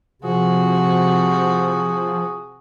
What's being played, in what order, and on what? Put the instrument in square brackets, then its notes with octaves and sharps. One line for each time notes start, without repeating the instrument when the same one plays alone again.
[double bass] C3 [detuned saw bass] F3 [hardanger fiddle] F#4 [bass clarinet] G#4